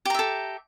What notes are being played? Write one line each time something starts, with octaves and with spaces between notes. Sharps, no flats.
G4 A4 E5 A#5